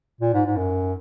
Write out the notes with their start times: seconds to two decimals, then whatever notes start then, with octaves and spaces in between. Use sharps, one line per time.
0.21 A#2
0.34 G#2
0.46 G#2
0.56 F#2